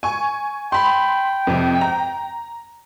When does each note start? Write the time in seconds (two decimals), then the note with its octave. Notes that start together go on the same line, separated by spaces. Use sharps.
0.03 G#5 C#6
0.72 G5 B5 C6
1.47 F2 C3
1.81 A#5